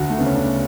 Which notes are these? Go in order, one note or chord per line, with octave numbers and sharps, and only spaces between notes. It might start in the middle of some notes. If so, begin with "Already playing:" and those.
Already playing: D2 F#4
A3
C#3 B3
C#4
D4